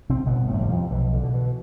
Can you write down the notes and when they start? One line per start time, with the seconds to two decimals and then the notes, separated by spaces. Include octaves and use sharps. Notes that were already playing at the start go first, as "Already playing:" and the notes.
0.09 C3 C4
0.26 G1 B2 B3
0.48 A2 A3
0.58 F2
0.62 C3 G3
0.69 F2 F3
0.90 B1 E3
1.13 D3
1.23 B2
1.34 E3